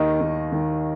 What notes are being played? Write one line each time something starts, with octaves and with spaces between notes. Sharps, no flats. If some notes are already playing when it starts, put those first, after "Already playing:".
Already playing: D#2 D#3 D#5
D#3
D#3